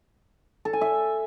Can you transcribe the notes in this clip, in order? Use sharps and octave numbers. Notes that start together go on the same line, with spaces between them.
A4
G#5
E5